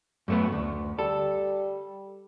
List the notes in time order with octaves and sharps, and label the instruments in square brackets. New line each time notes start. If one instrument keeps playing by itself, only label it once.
[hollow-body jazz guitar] F#2 A3 B3
D2
[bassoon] G3 [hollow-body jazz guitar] A4